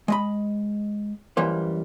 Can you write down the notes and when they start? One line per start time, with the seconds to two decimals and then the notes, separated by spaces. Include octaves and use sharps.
0.08 G#3 D#5 B5
1.37 F#2 E3 G3 A#3 C5